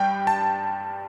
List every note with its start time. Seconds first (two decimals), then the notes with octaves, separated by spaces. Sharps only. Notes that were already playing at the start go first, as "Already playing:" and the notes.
Already playing: G2 G3 G5
0.27 A5